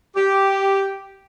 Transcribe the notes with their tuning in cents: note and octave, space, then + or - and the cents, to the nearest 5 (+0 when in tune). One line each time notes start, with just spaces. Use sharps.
G4 -5